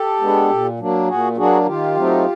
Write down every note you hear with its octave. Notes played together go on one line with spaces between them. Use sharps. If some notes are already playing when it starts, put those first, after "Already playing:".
Already playing: G4 A4
G#3 B3 D4
A#2
F#3 A#3 D4
A#2 F#4 G#4
F#3 A#3 D4 F#4 G#4
D#3 F4 G4
F#3 A3 C4 D#4